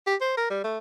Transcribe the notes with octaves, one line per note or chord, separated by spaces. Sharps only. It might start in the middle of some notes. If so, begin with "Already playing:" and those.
G4
C5
A#4
G3
A3